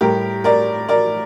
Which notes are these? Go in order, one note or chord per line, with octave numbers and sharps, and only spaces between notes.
A2 G3 G4 A#4
A#4 D5
A#4 D5